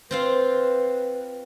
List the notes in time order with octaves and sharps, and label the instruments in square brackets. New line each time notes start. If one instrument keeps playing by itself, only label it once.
[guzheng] C4 F4 F5 [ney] B4